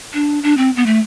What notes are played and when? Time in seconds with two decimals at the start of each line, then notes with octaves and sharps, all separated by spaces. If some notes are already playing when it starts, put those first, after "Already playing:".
0.14 D4
0.43 D4
0.57 C4
0.76 B3
0.86 A3